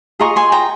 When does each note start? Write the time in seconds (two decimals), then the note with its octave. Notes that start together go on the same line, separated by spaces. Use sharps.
0.20 F4 G#4 D#5 A#5 C#6
0.36 G#5 C6
0.52 G5 A#5